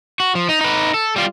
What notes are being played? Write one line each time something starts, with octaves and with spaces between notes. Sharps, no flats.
F#4
F3
D#4
D#4 B4
A4
G3 F4